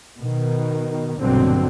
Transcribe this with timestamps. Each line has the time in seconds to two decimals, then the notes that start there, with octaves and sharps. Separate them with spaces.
0.18 B2 D#3
1.19 A#1 G2 B2 D3 F#3 C4